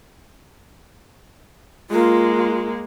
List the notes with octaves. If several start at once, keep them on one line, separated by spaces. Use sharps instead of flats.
G#3 A#3 F4